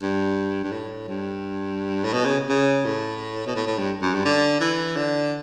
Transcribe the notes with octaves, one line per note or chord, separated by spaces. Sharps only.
G2
G2
A2
G2
A2
B2
C#3
C#3
A2
B2
A2
A2
G2
F#2
G2
D3
E3
D3